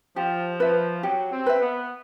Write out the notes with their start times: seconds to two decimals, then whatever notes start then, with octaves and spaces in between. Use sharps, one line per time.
0.16 F3 G4
0.60 F3 B4 E5
1.03 F#3 G4
1.32 C4
1.46 B4 E5
1.61 B3